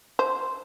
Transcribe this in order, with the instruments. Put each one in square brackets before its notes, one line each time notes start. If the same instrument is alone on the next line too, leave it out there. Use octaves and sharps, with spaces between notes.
[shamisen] C5